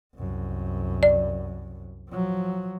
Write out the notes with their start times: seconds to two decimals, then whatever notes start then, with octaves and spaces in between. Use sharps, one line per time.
0.16 C2 F#2
1.03 D5
2.08 F3 F#3